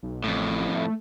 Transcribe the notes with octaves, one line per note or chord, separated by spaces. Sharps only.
B1
A1 F2 A2
A3